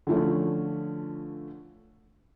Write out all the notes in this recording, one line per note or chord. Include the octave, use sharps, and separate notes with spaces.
D3 E3 F3 A3 C#4